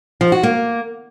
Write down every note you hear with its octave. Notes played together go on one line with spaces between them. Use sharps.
F3
F#4
A#3